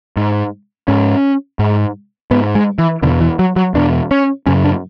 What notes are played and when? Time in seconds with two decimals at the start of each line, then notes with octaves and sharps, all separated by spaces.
0.17 G#2
0.88 G#2 C#4
1.59 G#2
2.31 G#2 B3
2.55 G#3
2.79 E3
3.02 E2 B2 D3
3.21 E3
3.39 F#3
3.56 F#3
3.74 E2 B2 D4
4.11 C#4
4.46 F#2 C#3 C#4
4.64 D4